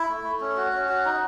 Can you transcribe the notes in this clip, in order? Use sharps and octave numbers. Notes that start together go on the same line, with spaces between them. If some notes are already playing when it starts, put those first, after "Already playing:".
Already playing: E4
A3
A3
C#4
F#4
C#4
F#4
D#4